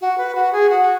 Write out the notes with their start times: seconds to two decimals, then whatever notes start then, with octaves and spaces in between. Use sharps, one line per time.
0.01 F#4
0.18 B4
0.35 F#4
0.53 G#4
0.69 F#4